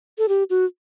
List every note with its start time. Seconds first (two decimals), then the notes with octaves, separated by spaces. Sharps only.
0.18 A4
0.29 G4
0.50 F#4